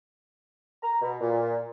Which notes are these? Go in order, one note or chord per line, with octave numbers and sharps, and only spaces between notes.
A#5
B2
A#2